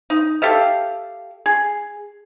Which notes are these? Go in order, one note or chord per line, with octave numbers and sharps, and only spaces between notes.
D#4
G4 A4 E5 F5
G#4